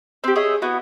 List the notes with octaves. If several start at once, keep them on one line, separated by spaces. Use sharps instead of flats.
C4 G4
G#4 C#5 D#5 E5
B3 E4 F#4